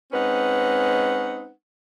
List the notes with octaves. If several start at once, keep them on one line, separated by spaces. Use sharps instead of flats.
G#3 C4 C#4 D#4 B4 F#5